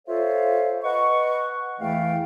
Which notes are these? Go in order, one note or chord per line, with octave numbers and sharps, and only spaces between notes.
F4 A4 C5 C#5 E5 F5
B4 D#5 F#5 C#6
E2 E3 A3 E4 F5 G5